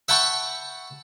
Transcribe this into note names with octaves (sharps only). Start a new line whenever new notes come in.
E5 F#5 G5 A5 B5 C#6